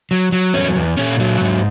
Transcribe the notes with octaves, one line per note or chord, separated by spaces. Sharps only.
F#3
F#3
E2 C#4
E2
A#2 C#4
F#3
G#2